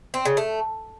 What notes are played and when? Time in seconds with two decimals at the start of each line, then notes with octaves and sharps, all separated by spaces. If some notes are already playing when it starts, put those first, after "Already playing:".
0.14 C4
0.25 C#3
0.37 A3